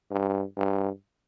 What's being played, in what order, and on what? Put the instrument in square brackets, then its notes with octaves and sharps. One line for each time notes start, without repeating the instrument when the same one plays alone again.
[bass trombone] G2
G2